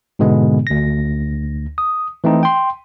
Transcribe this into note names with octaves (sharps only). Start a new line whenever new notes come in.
G#2 B2 D3 G#3 B3
D2 A#6
D#6
E3 A3 C4 D#4
G5 C6